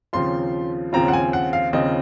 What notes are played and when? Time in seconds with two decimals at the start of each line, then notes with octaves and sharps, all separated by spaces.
0.13 D#2 C#3 F3 C4 F4 C6
0.93 D#2 C#3 F3 C4 F4 A#5
1.08 F#5
1.13 G#5
1.33 F#5
1.53 F5
1.73 D#2 C#3 F3 C4 F4 D#5